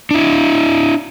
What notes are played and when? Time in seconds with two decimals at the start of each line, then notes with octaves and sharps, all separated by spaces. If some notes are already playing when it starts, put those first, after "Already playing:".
0.11 D4 E4